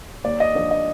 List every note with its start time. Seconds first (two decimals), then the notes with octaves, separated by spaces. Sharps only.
0.24 D#2 D5
0.40 D#5
0.55 D3 F3 D5
0.71 D#5